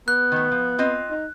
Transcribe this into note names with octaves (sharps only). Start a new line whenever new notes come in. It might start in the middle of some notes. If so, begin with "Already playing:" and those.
B3 F#6
D#3 A3
F3
C4 F4 D#5
D#4